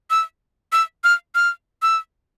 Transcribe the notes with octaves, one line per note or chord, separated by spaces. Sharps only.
E6
E6
F6
F6
E6